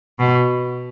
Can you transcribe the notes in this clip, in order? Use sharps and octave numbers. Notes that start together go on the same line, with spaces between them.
B2